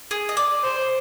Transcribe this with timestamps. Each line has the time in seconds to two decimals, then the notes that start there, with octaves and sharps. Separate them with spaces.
0.11 G#4
0.29 D#5
0.37 D5
0.63 C5